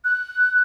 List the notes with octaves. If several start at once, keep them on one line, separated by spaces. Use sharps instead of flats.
F#6